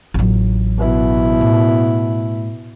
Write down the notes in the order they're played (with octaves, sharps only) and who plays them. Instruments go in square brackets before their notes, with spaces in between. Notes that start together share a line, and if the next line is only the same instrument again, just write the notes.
[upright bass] A1 F#3
[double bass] B2 E4
[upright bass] A2